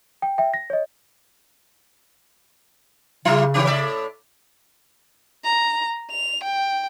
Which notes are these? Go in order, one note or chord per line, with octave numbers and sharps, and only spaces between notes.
G5
E5 G5
A#6
C#5 D#5
C#3 F#3 E4 F4
D#3 C#4 G4
A2 D5 E5
A#5
F7
G5